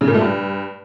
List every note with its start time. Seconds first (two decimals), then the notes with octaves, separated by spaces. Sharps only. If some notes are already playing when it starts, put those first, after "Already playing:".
0.01 C#3
0.08 A#2
0.14 A3
0.21 G2